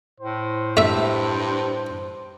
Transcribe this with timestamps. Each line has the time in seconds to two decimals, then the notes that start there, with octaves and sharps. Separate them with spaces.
0.21 A2 C5
0.77 G2 A3 E5